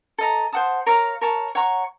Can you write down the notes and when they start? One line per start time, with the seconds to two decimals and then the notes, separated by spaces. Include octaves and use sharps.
0.18 A4 D#5 A#5
0.52 C5 F#5 A5 D#6
0.86 A#4 C#5 F5 A#5
1.21 A#4 C#5 A5
1.55 C#5 F#5 A#5 C#6